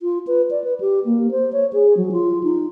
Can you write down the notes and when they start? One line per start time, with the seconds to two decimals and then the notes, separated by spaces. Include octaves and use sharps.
0.01 F4
0.27 B4
0.51 D5
0.64 B4
0.80 G4
1.05 A#3
1.31 C5
1.53 C#5
1.73 G#4
1.97 F#3
2.12 F4
2.43 D#4